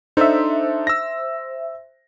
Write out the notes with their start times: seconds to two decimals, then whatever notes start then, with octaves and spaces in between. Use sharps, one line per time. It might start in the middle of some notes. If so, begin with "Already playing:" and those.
0.17 D4 D#4 A4 C5 E5
0.87 E6 A#6